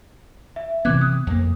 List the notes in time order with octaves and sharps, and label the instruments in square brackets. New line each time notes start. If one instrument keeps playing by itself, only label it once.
[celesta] E5
[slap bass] C3 E3 B3 [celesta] D6 F#6 G#6
[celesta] D#6
[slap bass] F2 A#3